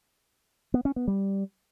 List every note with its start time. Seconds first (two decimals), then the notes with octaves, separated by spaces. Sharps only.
0.74 B3
0.85 C#4
0.96 B3
1.08 G3